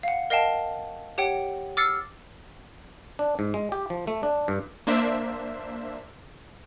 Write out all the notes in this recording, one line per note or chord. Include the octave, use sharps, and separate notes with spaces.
F5 F#5
A#4 D#5 F5 G5 A5
G4 C#5 F#5 G5
D6 E6 F6 A6 C7 C#7
D4
G#2
G#3
G4
F3
A3
D4
G2
A#3 D4 C5 E5